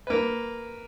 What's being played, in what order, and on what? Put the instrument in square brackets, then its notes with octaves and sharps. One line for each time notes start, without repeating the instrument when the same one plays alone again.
[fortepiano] A#3 B4